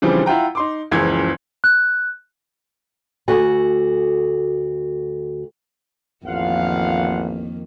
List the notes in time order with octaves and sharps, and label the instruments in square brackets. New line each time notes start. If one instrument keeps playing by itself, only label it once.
[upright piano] C#3 E3 F3 G3 C4 D4
E4 F4 F#5 G5 A#5
D#4 C6 D6
F#1 C#2 E3 F3 G#4 G#6
[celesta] F#6
[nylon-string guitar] D2 F#4 A4 G#5
[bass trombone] A1 [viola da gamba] F2 D#3 A#3 [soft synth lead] F4 [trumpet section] F5 F#5